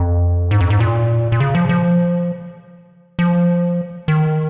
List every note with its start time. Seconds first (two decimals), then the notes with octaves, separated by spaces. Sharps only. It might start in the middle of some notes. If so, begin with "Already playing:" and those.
Already playing: F2
0.51 G#2
0.61 F2
0.70 G#2
0.80 A#2
1.32 A#2
1.40 C#3
1.55 F3
1.69 F3
3.19 F3
4.08 D#3